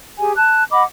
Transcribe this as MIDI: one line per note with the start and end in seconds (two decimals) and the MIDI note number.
0.18 0.35 67
0.18 0.35 68
0.18 0.35 80
0.36 0.63 81
0.36 0.63 90
0.71 0.83 75
0.71 0.83 78
0.71 0.83 83
0.71 0.83 86